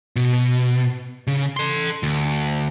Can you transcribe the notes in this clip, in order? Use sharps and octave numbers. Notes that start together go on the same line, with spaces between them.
B2
C#3
A4 C6
D2